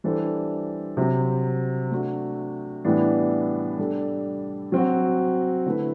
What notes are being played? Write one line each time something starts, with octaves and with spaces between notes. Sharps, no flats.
E3 G3 D4 A4 C5
C3 F#3 C4
A3 D4 F#4
A2 E3 G3 B3 D4
G3 D4 A4
F#3 C4 F#4
D3 A3 E4 B4